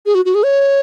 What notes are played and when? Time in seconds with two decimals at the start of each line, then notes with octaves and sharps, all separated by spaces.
0.06 G#4
0.15 F#4
0.25 F#4
0.35 G#4
0.43 C#5